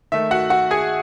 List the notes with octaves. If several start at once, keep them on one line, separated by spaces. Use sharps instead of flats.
D#3 A3 E5
F#4 F#5
F#4 F#5
G#4 G#5